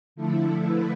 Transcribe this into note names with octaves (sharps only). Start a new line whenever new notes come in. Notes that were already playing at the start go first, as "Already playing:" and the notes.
D3 F3 A3 E4 A4
B4